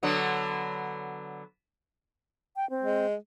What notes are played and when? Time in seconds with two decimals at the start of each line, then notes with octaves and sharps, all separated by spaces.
0.03 D3 F#3 B3
2.56 G5
2.70 C4
2.82 G#3